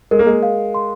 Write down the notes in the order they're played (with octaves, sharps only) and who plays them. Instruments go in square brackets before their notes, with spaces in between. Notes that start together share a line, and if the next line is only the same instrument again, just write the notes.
[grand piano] G#3 [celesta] A#4
[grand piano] A#3
G#3
[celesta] F5
C6